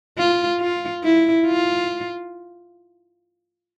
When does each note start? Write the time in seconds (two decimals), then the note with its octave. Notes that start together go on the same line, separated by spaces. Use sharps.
0.18 F4
0.60 F4
1.03 E4
1.46 F4